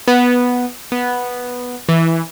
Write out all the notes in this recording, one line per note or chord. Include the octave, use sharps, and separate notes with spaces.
B3
B3
E3